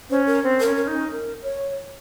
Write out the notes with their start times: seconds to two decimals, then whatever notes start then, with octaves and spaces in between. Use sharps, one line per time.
0.10 C#4 C5
0.26 A#4
0.43 C4
0.60 C#4 A#4
0.76 A#4
0.87 D#4
0.93 C#4
1.10 A#4
1.43 C#5